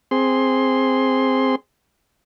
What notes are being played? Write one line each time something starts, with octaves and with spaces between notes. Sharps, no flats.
C4 G#4 C6